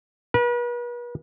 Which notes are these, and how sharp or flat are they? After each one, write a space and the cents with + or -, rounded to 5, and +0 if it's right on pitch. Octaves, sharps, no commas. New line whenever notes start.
B4 -40